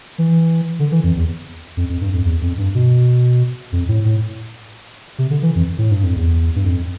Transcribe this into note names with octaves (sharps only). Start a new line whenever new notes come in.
E3
D3
E3
F2
E2
F2
F2
G2
F2
E2
F2
G2
B2
F2
A2
A2
C3
D3
E3
F2
A2
G2
F2
E2
G2
F2